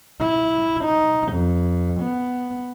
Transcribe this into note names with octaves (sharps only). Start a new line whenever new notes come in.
E4
D#4
F2
B3